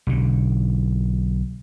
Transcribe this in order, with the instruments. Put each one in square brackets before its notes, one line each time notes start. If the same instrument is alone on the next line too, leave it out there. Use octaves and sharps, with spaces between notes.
[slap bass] B1 D3